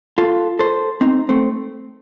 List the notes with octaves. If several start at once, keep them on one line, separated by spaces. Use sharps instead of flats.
F4 A4
A4 C5
C4 D#4
A3 C4